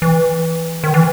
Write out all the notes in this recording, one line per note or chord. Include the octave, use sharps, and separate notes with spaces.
E3
D#3
E3